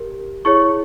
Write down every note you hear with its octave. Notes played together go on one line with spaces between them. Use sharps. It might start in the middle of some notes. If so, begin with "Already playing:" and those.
Already playing: G4 A#4
E4 G#4 C#5 C#6